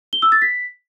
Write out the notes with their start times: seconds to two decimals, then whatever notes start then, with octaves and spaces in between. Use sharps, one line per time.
0.13 G7
0.22 E6
0.32 A6
0.42 B6